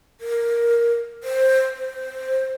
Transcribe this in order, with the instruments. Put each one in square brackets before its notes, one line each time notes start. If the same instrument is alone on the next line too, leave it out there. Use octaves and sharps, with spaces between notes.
[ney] A#4
C5
C5